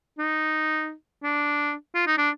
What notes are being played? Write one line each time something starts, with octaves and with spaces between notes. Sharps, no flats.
D#4
D4
F4
D#4
D4